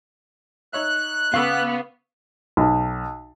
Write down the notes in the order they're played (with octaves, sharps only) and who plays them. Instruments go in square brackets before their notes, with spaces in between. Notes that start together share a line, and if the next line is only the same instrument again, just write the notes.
[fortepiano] D#4 C#5 E5 [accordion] F#6
[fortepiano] C#3 C#6 E6 [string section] B3 [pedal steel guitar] F5 D6
[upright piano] B1